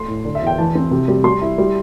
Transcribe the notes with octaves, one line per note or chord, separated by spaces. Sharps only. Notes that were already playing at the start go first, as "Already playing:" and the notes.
Already playing: A3 C6
A2
D3
E5
E2 G5
E3 A5
C4
C3
G3
G3 C6
E4
G3